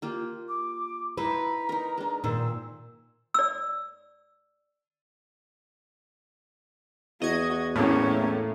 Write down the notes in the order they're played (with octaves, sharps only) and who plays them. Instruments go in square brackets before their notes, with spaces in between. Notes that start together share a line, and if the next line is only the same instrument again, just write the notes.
[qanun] A#3 F4 G4
[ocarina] D6
[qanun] D#4 E4 C5 [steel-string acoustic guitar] B4 [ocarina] A#5
[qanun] D#4 A#4
G#3 D4
[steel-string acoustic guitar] A#2 [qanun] D#3 G#4 C5 [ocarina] E6
[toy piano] D5 E6
[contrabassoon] E2 [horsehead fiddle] F#4 [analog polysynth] D#5 G#6
[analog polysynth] A2 [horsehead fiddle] A#3 C#4